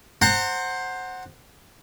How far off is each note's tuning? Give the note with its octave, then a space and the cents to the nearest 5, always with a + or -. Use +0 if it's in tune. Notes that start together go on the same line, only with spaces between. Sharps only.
C5 +10 F#5 +0 A#5 -35